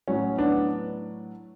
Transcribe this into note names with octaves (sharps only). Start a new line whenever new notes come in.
A2 F#3 C#4
B3 D4